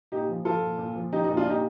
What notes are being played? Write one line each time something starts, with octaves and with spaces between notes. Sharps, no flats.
A#2 D#4 G4
F3
F3 F4 A4
A#2
A#2
F3
F3 D#4 G4
D#4
A#2
D4 F4
A#2 D#4 G4